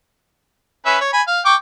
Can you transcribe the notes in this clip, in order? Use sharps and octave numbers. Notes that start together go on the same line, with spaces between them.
C#4 B4 E5
C#5
G#5 B5
F5
G5 C#6 D6